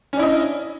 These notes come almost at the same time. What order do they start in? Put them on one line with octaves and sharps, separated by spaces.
C#4 D4 E4 D#5